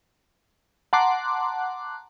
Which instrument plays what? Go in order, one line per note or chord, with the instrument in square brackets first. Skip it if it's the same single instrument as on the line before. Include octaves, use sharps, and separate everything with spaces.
[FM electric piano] F#5 A5 A#5 C6 D6 F#6